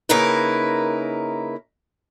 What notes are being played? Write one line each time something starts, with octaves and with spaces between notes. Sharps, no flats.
C#3 A#3 D#4 E4 A#4 B4